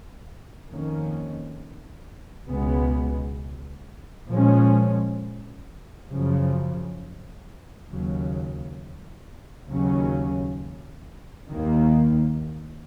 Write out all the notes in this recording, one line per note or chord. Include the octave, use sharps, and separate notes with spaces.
F2 D#3 A#3 C#4
C#2 B2 G#3 B3
A#2 F3 G#3 C#4
F#2 C#3 F3
D#2 C#3 F#3
D#2 C#3 F#3 C#4
D#2 D#3 A#3